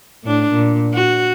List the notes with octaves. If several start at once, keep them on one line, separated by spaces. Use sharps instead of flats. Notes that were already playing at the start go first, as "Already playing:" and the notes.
A2 D4
A#2
F#4